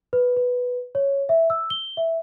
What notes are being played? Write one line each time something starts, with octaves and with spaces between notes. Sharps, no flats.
B4
B4
C#5
E5
E6
G7
E5